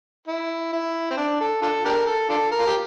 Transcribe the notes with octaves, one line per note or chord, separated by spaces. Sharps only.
E4
E4
C4
D4
A4
D4 F4 A4
D4 G4 A#4
A4
D4 F4 A4
A#4
F4
G4